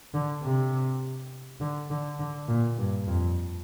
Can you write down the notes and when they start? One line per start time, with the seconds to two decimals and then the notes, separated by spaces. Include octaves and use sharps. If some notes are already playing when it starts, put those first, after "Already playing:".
0.14 D3
0.43 C3
1.60 D3
1.90 D3
2.19 D3
2.48 A#2
2.78 G2
3.07 F2